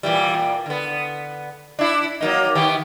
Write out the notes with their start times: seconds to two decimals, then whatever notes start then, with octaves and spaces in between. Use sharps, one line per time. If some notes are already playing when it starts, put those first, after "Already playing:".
0.03 A#2 E3 G3
0.34 A#2
0.66 D3 B3
1.79 D4 E4
2.21 F#3 A#3 D#4
2.55 D#3 B3 G4